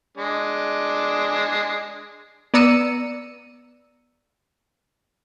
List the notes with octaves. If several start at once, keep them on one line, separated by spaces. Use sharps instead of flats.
G#3 D4
B3 D5 A#5 E6 C#7 D#7